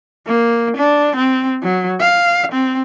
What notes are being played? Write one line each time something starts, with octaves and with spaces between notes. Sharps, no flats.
A#3
D4
C4
F#3
F5
C4